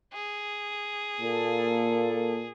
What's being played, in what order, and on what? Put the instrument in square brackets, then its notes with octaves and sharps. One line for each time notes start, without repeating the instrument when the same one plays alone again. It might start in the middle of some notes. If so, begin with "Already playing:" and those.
[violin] G#4
[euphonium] A#2 [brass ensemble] A#3 A4